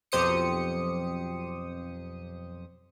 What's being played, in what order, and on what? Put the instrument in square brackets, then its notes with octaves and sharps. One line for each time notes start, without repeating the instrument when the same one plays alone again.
[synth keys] B1 F2 G4 C5 D#6 C#7